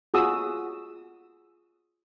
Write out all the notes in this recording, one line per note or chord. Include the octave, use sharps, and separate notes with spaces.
F4 F#4 G#4 D#6 E6